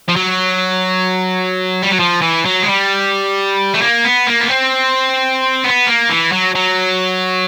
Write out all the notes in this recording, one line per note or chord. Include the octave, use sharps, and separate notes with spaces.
F3
F#3
G3
F#3
F3
E3
F#3
G#3
G3
A3
A#3
B3
A#3
B3
C4
B3
A#3
E3
F#3
F#3